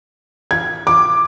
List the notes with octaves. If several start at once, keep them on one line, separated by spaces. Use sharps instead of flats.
G#6
D6